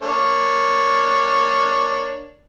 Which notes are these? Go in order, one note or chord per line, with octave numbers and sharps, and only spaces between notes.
A#3 D4 C#5